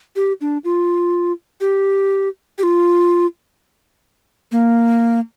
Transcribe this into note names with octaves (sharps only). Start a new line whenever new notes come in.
G4
D4
F4
G4
G4
F4
A#3